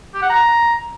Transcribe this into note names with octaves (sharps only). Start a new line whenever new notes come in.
G4
F#5
A#5